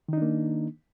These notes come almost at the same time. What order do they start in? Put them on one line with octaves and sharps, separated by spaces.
D#3 D#4 D4 A#3